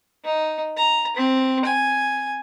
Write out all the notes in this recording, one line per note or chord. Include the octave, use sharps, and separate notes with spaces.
D#4
A#5
C4
G#5